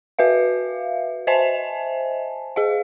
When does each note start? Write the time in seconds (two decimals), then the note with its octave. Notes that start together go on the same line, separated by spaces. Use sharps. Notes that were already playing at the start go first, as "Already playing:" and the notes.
0.19 F#4 B4 E5 F5
1.27 C5 D#5 E5 G#5 A5
2.56 G#4 D#5 F5